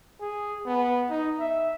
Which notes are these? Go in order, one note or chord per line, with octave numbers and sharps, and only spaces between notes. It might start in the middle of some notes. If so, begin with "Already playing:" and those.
G#4
B3
D#4
E5